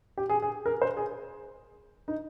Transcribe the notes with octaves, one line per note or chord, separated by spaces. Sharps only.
G4
G#4
G#4
A#4
C5
G#4
D#4